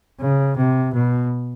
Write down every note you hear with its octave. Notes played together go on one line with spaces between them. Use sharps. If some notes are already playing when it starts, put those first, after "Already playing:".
C#3
C3
B2